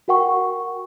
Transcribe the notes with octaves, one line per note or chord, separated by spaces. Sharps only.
F#4 A#4 F#5 G5 C#6